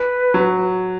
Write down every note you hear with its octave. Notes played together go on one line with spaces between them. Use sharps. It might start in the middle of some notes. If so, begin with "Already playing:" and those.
Already playing: B4
F#3